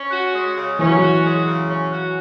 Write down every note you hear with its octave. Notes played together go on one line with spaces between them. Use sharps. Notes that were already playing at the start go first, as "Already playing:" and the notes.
Already playing: C#4
F#4
G#3
C#3
E3 C#4
F#3
E3
F#4
G#3
C#3
C#4
F#4